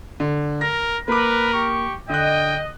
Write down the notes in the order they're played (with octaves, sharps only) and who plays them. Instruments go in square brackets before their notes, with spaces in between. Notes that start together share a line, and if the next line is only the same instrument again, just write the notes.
[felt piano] D3
[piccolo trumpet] A#4 [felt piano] A#6
[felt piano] A#3 D6 [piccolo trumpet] A#4 [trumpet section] B4
[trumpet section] G4 C#6
[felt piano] D3 F#6 [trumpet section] D#5 [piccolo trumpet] G5